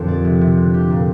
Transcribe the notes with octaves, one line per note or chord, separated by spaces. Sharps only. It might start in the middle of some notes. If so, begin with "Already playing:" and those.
Already playing: F2 A#2 D3 F3 G4
D5
C3
C3
D3
G4
A#2